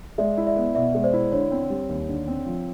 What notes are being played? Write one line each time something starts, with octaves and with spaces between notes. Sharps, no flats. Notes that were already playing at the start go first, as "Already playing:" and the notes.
G#3 D5 E5
E4
D5 E5
B3
B2 D5 E5
G#3
C5 D5
E4
D3 C#5
C4
G3
D#2
D3
C4
F3